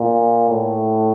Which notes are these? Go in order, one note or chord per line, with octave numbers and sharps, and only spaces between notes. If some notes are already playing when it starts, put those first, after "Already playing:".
Already playing: A#2
A2